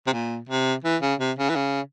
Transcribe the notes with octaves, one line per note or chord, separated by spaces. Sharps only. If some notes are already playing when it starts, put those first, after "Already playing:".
C3
A#2
C3
E3
C#3
C3
C#3
E3
C#3